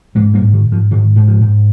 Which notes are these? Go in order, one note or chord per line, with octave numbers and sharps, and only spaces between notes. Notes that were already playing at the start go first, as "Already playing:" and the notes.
G#2 F3 G#3
G3 A#3
G#2
D#3
G#2
F3
G#2 D#3
G#2
F3
G#2